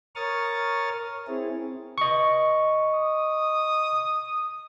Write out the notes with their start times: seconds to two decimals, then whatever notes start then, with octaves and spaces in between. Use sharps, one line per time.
0.15 A#4 C#5 C#6 D#6 F6 A6
1.27 C4 E4 G#4
1.98 D#5 C#6
2.94 D#6